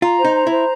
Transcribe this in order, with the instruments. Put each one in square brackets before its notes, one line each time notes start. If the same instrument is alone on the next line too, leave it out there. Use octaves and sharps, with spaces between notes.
[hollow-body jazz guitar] F4 [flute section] A#5
[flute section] C5
[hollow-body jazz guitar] D#4
[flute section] A#5
[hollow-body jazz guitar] E4
[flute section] C5